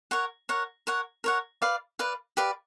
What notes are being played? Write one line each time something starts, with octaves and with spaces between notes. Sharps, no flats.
A#4 C#5 F#5
A#4 C#5 F#5
A#4 C#5 F#5
A#4 C#5 F#5
B4 D5 F5
B4 D5 F5
G4 B4 D5 F5